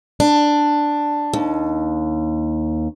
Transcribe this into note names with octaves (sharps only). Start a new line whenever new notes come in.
D4
D#2